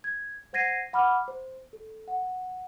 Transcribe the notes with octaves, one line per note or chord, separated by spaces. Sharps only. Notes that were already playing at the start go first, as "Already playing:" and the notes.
G#6
C5 F#5 G#6 A#6 C7 D#7
F#5 B5 D6 F6
C5
A4
F#5